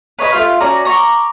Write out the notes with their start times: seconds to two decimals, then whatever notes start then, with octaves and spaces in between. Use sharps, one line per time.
0.19 B4 C#5 D#5 B5
0.32 A3 F4 F5
0.60 C#4 F#4 D5 A#5
0.85 A#5 C#6 D6